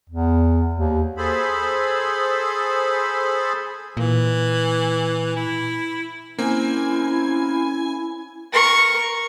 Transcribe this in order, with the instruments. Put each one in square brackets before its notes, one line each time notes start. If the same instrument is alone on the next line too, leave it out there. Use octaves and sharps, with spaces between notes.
[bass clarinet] E2
D#2
[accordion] G#4 A4 C5 B5
[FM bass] A#2 [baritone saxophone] E3
[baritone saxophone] E4
[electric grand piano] A#3 C4 [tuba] C#4 [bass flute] E4 [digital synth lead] G#5
[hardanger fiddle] A#4 C#6